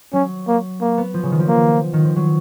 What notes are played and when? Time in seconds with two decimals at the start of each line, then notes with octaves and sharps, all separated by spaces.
0.13 F#3 C#4
0.48 A#3
0.81 A#3
0.98 B3
1.14 F3
1.23 C#3
1.31 D#3
1.40 F3
1.48 A#3
1.93 D#3
2.05 F3
2.16 F#3